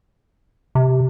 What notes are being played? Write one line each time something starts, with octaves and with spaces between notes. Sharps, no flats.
C3